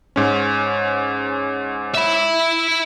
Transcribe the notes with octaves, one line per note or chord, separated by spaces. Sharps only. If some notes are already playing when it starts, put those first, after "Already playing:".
G#2 C#4
E5 B5